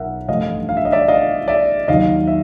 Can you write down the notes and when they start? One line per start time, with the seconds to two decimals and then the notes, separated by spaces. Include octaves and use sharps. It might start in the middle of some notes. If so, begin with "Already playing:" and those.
Already playing: B1 A#4 E5 F#5
0.28 A1 G2 D3 F3 A3 D#5 F5
0.69 F5
0.77 E5
0.85 D#5
0.92 D5 E5
1.08 D#5 F5
1.48 D5 E5
1.88 D#2 D#3 F#3 D#5 F5
2.27 E5